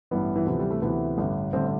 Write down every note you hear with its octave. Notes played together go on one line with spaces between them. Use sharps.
A1 G2 E3 B3
E3
D2 C3 E3 F3
G3
A3
D2 C3 E3 B3
A1 G2 D3
A1 G2 D3 C4